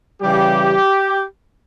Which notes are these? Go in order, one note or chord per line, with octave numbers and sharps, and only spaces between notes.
C#3 E3 G3 G4